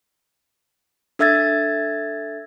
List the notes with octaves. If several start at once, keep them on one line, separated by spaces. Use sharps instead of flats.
D4 A4 E5 E6 G#6 A6